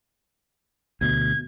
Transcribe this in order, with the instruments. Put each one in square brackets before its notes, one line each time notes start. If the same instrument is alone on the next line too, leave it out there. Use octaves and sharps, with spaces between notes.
[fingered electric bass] D2 B2 [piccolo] G#6